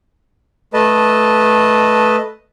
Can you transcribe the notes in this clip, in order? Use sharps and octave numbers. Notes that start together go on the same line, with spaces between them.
A3 B4 D#5 A5